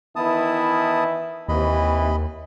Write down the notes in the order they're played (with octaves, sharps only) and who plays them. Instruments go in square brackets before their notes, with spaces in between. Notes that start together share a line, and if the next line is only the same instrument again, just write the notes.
[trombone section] D#3 E3 E4 [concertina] B3 A5 D#6
[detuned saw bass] D#2 [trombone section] C3 E3 [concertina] D#5 B5